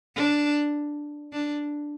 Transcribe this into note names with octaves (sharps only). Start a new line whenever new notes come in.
D4
D4